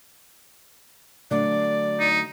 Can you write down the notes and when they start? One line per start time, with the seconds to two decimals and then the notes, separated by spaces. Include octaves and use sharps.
1.31 D3 F#3 A3 D5
2.00 D#4